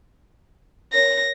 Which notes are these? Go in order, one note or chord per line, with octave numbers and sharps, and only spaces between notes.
A#4 C#5 A#6